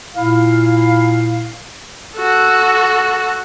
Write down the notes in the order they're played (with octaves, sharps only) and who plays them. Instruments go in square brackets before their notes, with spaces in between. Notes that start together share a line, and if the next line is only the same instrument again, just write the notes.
[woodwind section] A#2 E4 F5
[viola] F#4 A4